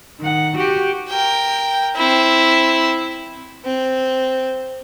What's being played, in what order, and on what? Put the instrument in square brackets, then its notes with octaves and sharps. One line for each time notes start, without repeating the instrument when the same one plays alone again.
[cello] D#3 F#5
F#4 G4
[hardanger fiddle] A#4 G5
C4 E4
C4